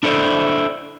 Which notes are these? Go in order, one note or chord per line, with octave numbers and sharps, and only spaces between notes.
D4 E4 A4 C5 D5